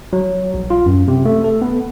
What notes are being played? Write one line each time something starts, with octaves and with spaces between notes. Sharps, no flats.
F#3
A#1
F4
F#2
C3
A3
A4
B3